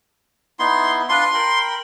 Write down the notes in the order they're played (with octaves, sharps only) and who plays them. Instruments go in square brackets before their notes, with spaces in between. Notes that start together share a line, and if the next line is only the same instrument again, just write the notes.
[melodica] B3 D#4 E4 [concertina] C6
[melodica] D4 F4 B4 [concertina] C6
[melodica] A#4 G5 B5